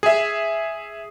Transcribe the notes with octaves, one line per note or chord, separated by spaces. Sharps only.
G#4 E5